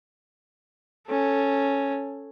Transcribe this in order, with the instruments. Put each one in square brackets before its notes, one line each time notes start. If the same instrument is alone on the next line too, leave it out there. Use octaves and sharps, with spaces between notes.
[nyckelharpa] C#4 A4